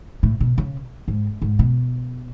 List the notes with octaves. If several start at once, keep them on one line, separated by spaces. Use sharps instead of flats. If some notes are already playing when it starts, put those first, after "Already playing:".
A2
B2
C#3
G#2
G#2
B2